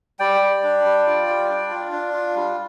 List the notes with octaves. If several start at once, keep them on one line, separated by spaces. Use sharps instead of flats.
G3 D5 G5
G3
D4
G3
F4
G3
D4
F4
D4
F4
G3